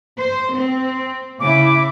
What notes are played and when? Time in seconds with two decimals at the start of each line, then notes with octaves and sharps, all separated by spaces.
0.17 C5
0.55 C4
1.40 C#3 E4 D6